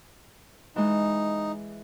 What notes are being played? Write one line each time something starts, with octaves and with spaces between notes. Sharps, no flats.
E3 G#3 D#4